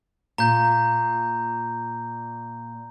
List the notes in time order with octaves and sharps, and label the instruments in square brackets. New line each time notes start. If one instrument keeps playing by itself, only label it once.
[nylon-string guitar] A#2 [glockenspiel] A#5 G6